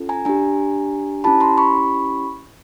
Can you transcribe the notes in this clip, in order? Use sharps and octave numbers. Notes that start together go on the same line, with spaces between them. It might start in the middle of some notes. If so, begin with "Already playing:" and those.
Already playing: C#4 F4 A4
G#5 A#5
D4 G4 G#5 A#5
C#4 E4 G4 A5 B5
A#5 C6
B5 C#6